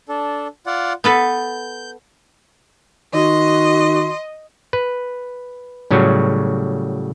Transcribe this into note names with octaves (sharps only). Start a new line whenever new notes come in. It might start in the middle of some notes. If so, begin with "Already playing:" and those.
D4 A4
F4 D5 F#5
B3 A4 B4 G6
D#3 F#4 D#5 C6
B4
A2 C#3 F#3 G3 F#4